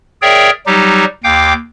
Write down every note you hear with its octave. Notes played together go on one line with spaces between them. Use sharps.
G#4 A#4 C#5 D5 E5 G5
F#3 G3 D#4 G4
D#2 F5 G5 D6 G6